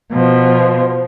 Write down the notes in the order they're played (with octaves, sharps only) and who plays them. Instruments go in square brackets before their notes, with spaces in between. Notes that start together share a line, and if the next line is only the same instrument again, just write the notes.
[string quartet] B2 F3